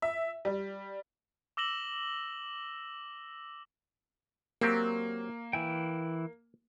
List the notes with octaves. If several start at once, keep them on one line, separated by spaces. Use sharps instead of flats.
E5
G3
D6 E6 A#6 E7 F#7 G7
F#3 A#3 C4 G4
E3 E4 G5 G#5